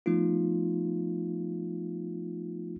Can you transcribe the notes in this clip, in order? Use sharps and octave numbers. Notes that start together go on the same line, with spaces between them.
F3 A3 B3 D#4 F4